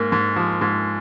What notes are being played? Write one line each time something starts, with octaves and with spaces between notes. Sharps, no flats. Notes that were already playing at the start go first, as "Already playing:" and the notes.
Already playing: G#2 A#3
G#2
F3
G#2